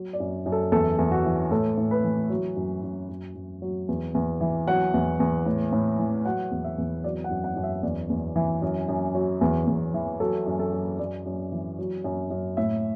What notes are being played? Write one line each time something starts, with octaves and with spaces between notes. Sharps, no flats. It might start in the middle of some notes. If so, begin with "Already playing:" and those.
Already playing: F#3
D5
F#2
F#2
A4
E2 A4
E2
F#4
E3
A2 A4
A2
B4
E3
F#3
F#2
F#2
F#2
F#2
F#3
E2
E2
E3
F#3 F#5
E2
E2
A2
A2
E3
F#3 F#5
E2
E5
E2
F#3 D5
F#5
F#2
F#5
F#2
E5
E2 D5
E2
E3
F#2
F#2
F#3
E2
E2
E3
F#3 A4
F#2
A4
F#2
F#2 D5
F#2
E3
F#3
F#2
F#2
A2 E5